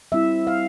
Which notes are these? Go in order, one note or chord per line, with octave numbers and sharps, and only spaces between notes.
G3 C4 E4 E5
F5